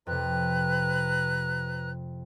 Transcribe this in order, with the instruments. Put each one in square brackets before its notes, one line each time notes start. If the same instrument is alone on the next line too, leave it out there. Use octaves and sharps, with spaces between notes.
[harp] F2 C3 [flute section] B4 A#5 F#6